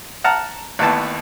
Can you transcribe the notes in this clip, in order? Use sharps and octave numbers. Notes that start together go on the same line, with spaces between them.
F#5 A5 A#5 F6
A1 D#2 B3 A5